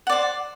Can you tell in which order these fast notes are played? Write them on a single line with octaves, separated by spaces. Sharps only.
F#5 D5 C5